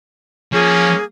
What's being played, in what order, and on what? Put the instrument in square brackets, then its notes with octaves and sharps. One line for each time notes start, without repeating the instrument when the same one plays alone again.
[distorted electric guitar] F3 [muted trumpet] A#3 [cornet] C#4 [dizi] G#4